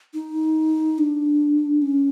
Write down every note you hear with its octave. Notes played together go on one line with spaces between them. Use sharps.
D#4
D4
C#4